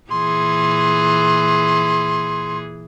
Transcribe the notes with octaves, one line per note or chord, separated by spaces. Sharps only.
A#2 E3 G#4 C6